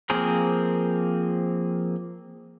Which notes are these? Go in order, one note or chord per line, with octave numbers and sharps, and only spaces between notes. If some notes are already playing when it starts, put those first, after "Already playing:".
F3 A#3 C4 G#4 A#4